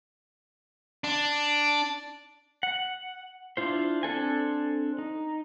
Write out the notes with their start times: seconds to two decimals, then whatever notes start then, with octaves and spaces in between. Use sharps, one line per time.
1.04 D4
2.63 F#5
3.57 D4 E4 F4 C5
4.03 C4 D4 A4 G#5
4.98 D#4